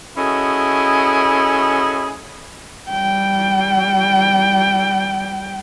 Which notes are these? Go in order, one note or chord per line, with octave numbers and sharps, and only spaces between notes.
C#4 E4 F#4 G#4 A4 D#5
G3 G5